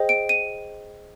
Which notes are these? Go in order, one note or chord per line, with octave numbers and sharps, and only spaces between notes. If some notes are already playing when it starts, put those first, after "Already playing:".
Already playing: G#4 C5 D#5 G5
D7
D#7